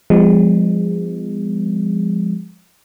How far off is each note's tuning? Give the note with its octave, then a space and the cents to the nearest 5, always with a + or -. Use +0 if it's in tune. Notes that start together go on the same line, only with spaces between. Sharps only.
F3 +0 G#3 -25 B3 +40